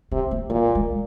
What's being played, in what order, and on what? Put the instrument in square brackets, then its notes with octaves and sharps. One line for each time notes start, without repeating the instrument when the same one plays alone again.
[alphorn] C3 [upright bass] C4
[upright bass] A#3
[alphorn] A#2 [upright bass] A#3
[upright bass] G#3